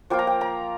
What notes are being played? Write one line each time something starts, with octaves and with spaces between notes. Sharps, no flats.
F3 A#3 F4 G5
A#5
G5
A#5